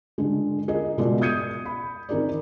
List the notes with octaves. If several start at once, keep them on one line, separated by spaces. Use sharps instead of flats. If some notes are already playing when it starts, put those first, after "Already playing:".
D3 G#3
G#4 A#4 D#5
B2 G#3 F4 F#4 D5
D#6 G6 G#6 C#7 D#7
B5
D#3 C4 D#4 G#4 A#4 D5